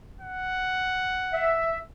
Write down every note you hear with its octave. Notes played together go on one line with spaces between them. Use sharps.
F#5
E5